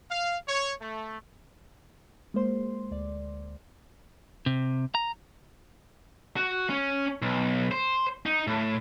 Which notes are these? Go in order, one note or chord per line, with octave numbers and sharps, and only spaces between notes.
F5
C#5
A3
G#3 A#3 C5 C6
D2 D5
C3
A#5
F#4
C#4
B1
C5
D#4
A2